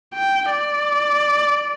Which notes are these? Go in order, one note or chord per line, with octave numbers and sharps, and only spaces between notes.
G5
D5